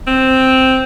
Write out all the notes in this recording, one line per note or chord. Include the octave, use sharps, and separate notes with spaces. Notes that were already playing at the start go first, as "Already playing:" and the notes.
C4